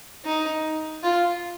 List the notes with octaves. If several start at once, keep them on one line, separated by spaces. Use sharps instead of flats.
D#4
F4